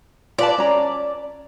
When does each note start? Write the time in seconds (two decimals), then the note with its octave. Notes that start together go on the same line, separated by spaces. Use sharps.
0.38 F4 B4 D5 A5
0.58 C#4 A#5